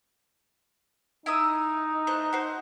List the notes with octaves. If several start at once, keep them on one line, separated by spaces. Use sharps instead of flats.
D#4 E4 D#6 E6
A3 C5 F#6
F#4 C5